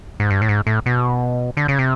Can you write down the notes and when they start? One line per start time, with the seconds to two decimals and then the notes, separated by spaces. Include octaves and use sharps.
0.20 G#2
0.30 G2
0.42 A2
0.49 G#2
0.67 A2
0.86 B2
1.57 D3
1.68 C#3
1.79 C3